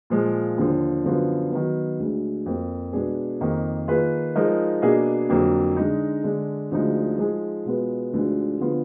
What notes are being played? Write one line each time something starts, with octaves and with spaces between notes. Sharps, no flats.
A#2 F3 G#3
D#2 D3 F3
F#2 D3 F3 B3 F4
D#3 F#3 B3
D2 D3 G#3
F2 F3 A#3 F4 A#4
B2 G#3 B3 D4 G#4
F2 D#3 A#3
D#3 A#3 F4 G#4 B4
F3 G#3 D#4 A#4 D#5
B2 A#3 D4 G#4 D#5
F2 D3 F#3 A#3
D3 G#3 D#4
D3 G#3 D4
D2 D3 F3 G#3 D#4
F3 G#3 D#4 G#4
B2 G#3 B3 F4 B4
D2 D3 F3 G#3 D#4
D3 F3 B3 F4